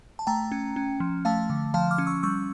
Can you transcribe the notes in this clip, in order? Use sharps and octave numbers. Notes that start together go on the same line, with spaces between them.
A5
A3 G5 A#5
C#4
C#4
F3
A3 F5 A5
D3
F3 F5 A5
D6 F6
C#4
C#6 E6
G3 C#6 E6